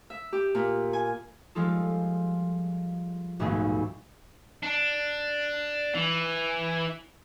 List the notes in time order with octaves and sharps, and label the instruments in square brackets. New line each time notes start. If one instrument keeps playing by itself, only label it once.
[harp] E5
G4
A#2
G#5
F3 G3 G#3 F4 A4
D#1 B1 G#2 G#3 A3 G#5
[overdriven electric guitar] D4
E3